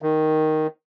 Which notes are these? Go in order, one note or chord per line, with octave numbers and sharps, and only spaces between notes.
D#3